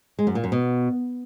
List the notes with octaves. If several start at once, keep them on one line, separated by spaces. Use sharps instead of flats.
G#3
F#2
A#2
F#2
B2